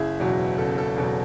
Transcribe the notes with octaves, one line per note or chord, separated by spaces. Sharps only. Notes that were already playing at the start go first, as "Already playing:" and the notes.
Already playing: F#1 E4 G#4
E2 B2 F#3
F#1 A4
A4
E2 B2 F#3 A4